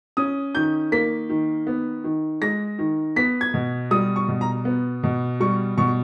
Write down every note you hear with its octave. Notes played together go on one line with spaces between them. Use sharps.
C#4 D#6
D#3 G6
A#3 B6
D#3
B3
D#3
G#3 A#6
D#3
B3 B6
G#6
B2
G3 D#6
C#6
B2
A#5
B3
B2
G3 C#6
B2 C#6